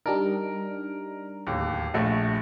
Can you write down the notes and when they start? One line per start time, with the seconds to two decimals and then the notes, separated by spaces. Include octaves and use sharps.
0.06 G3 D4 D#4 A#4
1.47 D1 D#2
1.94 A#1 A3 F#4